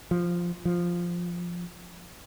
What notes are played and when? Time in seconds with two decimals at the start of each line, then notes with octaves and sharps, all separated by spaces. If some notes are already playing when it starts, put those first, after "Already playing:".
0.11 F3
0.65 F3